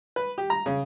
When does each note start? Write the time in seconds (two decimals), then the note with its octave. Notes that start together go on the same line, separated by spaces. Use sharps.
0.16 B4
0.38 G4
0.50 A#5
0.66 C#3